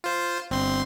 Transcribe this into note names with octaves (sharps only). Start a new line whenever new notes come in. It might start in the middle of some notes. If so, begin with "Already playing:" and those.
F4 C5
G1 C4 C6